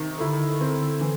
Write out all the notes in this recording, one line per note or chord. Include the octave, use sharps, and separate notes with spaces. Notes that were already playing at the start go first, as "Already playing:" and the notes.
Already playing: C3 D#3
D3 E4
C4
E3